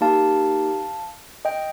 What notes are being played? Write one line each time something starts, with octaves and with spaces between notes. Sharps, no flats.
A#3 D#4 G4 F5 A5
D#5 G5